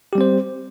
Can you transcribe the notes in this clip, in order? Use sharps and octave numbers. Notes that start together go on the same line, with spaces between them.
G3 C4 G4 C5